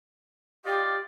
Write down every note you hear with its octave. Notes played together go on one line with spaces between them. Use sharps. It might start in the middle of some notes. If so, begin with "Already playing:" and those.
F4 G4 D5 D#5